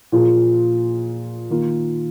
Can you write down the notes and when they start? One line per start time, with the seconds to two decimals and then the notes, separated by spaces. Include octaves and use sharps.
0.12 A#2 F3 A#3 F4 G#4
1.50 D#3 A#3 F4